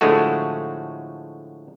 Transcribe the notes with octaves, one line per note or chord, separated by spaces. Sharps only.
A2 D3 F3 G#3 A3 F#4